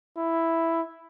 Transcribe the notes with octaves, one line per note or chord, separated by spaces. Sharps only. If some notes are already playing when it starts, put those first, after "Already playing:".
E4